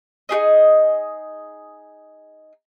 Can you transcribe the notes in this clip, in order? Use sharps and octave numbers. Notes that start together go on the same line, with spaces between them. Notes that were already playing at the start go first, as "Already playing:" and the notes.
D#4 G4 G#4 D#5